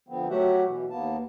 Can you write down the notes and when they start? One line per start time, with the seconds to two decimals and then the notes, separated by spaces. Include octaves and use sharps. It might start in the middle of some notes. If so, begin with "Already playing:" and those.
0.09 D3 F3 B3 C4
0.30 F#3 A3 F#4 G4 E5 F#5
0.66 B2 E3
0.90 D#2 A#3 B3 A5